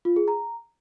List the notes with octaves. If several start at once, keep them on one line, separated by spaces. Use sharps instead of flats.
F4
G#4
A#5